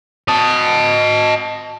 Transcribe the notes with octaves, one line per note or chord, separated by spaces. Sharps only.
D#5 A5